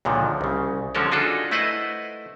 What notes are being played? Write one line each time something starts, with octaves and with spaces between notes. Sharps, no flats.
C#2 A#2 D3 D#3 F3
C2 C#3
D3 F3 G#3 C#4 A4 A#4
D4 D#4 F4 F#4 G#4 A4
A3 E4 B4 C5 D#5 F#5